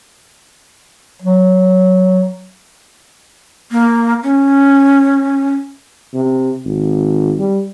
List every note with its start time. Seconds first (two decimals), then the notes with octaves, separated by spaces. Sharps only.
1.22 F#3
3.71 A#3
4.23 C#4
6.14 C3
6.65 G#1
7.38 G3